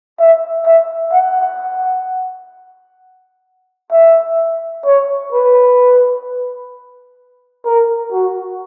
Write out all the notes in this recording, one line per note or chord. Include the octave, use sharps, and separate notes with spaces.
E5
E5
F#5
E5
C#5
B4
A#4
F#4